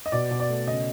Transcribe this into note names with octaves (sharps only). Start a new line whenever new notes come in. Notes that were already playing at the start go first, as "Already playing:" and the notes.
D#5
B2 D5
B2
D5
A3
C#3 D#5